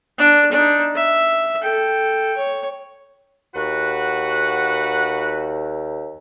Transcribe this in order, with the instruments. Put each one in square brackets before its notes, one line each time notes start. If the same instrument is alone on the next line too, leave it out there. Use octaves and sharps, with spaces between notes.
[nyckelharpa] D4
D4 D#4
E5
A4 G5
C#5
[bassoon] D#2 [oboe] F#4 [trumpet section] B4 F#5